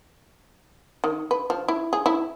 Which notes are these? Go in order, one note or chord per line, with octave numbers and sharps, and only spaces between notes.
D#3
B4
F3
E4
G#4
E4